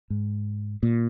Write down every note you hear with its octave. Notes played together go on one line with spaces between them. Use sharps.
G#2
A#2